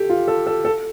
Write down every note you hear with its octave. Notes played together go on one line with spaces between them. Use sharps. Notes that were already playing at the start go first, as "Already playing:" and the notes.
Already playing: G4 A4
F4
A4
A4
A4